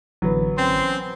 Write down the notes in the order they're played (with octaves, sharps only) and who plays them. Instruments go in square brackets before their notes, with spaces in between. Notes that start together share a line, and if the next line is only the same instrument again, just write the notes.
[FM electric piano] A1 D3 E3 [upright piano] F#3 B3
[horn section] C4 C#4 C6